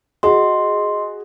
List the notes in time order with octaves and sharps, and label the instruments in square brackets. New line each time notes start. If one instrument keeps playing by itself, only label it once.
[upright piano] F#4 G#4 [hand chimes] D#5 C6